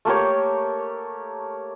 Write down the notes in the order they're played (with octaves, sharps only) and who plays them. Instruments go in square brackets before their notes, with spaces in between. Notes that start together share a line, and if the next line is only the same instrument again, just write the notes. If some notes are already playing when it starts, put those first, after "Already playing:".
[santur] A3 A#3 G4 C#5